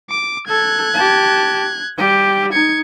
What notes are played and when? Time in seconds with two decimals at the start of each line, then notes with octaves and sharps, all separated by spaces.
0.10 D6
0.48 A4 F#6 G#6
0.94 G4 A5
1.97 G3 G4
2.52 D#4 G#6 C#7